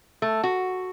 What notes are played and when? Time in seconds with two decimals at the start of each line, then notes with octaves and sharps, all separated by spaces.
0.22 A3
0.44 F#4